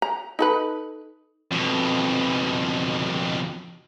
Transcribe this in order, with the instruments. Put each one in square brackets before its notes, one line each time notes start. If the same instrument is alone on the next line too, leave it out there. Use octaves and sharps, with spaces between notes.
[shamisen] A#5
D#4 A4 B4
[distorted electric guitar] F2 B2